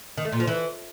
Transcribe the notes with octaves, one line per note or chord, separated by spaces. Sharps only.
D#3
A3
A#2
F3
E3